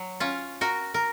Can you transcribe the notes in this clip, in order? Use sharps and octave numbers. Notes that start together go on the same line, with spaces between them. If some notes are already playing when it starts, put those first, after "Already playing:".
Already playing: F#3
C#4 F4
F#4 A#4
A#4